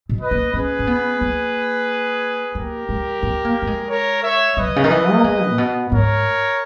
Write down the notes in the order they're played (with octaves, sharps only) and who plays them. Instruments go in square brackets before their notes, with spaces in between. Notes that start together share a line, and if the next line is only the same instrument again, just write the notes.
[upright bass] B2
[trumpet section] B4 D#5
[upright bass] A#3
[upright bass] C#4 [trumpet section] G#4 B4
[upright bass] C#4
B3
A#3
[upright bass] A#3 [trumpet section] G4 A#4
[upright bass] G#3
B3
A#3
A#3
G#3
[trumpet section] A#4 C#5
C#5 E5
[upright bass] G3 [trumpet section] B4 D#5
[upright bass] B2
C#3
D#3
E3
A#3
G#3
A#2
B2
[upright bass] G#2 [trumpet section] A#4 C#5